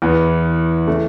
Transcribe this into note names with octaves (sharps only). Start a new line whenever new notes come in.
E2 E3 B3
C#3 E3 A3